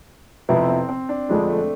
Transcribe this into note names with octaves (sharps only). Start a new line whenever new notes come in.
F2 C3 F3 B3 C4 E4
C4
C4
D4
F2 D3 F3 G#3 A3 D4
A3